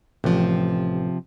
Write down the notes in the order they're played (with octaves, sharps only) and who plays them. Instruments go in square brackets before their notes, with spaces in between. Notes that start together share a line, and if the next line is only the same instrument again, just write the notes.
[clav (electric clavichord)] A1 [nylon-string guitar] C3 F3